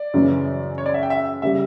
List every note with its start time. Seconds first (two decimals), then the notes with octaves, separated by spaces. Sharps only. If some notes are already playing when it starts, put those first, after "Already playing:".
Already playing: D5
0.14 F#2 C#3 E3
0.78 C#5
0.86 D5
0.94 E5
1.03 G5
1.10 E5
1.42 C#3 G3 E5